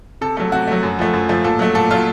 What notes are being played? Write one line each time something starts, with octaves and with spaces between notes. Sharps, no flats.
C3 A4
F#3 A3 A4
C3 F#4
F#3 A3
F#2
F3 A3
F#2
F3 A3
A#2 A4
F#3 A3
A#2 A4
F#3 A3 F4